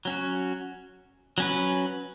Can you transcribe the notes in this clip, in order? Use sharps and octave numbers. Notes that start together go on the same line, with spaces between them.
F#3 C#4 F#4
F#3 C#4 B4